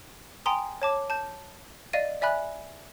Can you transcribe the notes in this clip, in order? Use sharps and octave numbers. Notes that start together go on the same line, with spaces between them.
G5 G#5 A#5 C6 D#6
C#5 A5 D6
A5 G6
D5 D#5 F5 A6 D#7
D5 E5 G#5 B5 F#6